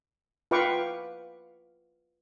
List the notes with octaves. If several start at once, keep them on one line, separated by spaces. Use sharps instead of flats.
F4 B4 F5 G5 C#6 D6